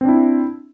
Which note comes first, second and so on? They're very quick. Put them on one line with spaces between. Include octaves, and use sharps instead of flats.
C4 D4 E4